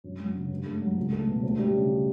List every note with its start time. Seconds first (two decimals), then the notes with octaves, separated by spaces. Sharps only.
0.04 F#2
0.20 F#3
0.35 C#3
0.51 G2
0.66 A3
0.82 F#3
0.97 C#2
1.12 A3
1.28 B2
1.43 D2
1.58 G3
1.74 C#3